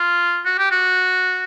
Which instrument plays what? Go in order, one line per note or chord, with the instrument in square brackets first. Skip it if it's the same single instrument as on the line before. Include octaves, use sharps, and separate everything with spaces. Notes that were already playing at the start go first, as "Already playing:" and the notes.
Already playing: [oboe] F4
F#4
G4
F#4